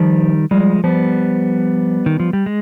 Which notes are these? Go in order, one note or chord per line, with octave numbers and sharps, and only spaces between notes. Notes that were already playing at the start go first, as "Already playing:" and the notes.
Already playing: D#3 F3 G3
F3 G3 G#3
F3 G3 B3
D#3
F3
G3
G#3